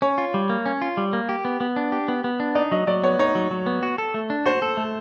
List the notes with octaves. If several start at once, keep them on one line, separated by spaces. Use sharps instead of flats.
C#4 C#5
F4
G3
A#3
C#4
F4
G3
A#3
G4
B3
B3
D4
G4
B3
B3
D4
D#4 D5
F#3 D#5
F#3 D5
B3 C#5
D#4 C#5
F#3
F#3
B3
F#4
A4
A3
D4
F#4 C5
A4
A3